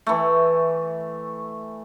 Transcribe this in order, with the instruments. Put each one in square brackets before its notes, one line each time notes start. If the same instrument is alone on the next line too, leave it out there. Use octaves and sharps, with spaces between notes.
[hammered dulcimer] E3 A3